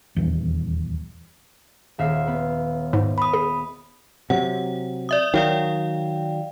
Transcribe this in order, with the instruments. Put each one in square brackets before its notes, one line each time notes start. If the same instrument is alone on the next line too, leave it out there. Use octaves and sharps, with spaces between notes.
[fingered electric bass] D#1 E2
[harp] D#1 E5 F5
B3
[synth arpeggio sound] G#2
[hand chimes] B5 D#6
[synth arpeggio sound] G#4
[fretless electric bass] C3 F#3 [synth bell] F#5
[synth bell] D5 E5 D#6
[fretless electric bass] D#3 F#3 [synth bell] D5 F5 G5